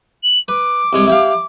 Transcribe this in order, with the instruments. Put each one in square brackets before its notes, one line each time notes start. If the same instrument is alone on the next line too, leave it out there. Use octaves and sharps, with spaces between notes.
[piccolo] F#7
[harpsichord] B4 [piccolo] D6
[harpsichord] C2 G#3 C#5
E4 G4 F5